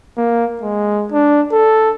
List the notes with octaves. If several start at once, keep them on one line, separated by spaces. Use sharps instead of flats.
A#3
G#3
D4
A4